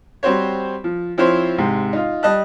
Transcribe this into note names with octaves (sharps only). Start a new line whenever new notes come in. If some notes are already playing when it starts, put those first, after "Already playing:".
G3 C4 F#4 C5 C#5
F3
F3 C4 E4 C5 C#5
G#2 C3
D#4 F4
G3 D#5 A5 F#6